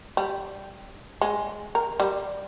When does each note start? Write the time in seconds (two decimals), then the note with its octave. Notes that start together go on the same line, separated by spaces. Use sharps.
0.17 G3
1.21 G#3
1.75 A#4
2.00 G3